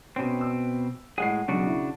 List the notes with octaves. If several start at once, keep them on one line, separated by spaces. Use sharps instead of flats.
B2 C4 C#4
E6
A2 G#3 G#4 F#5 C7
B1 C#3 F#3 D4 F#4
E4